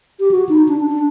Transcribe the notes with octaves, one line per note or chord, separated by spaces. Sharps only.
G4
F#4
D#4
D4
D4